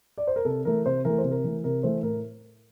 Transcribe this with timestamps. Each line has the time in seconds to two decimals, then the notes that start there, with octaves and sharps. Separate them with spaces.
0.18 D5
0.27 C5
0.36 A#4
0.45 C3 A4
0.65 E3 A3 A#4
0.86 C3 C5
1.05 E3 A3 A#4
1.18 C5
1.24 C3
1.31 A#4
1.44 E3 A3
1.64 C3 A#4
1.83 E3 A3 C5
2.03 A2 A#4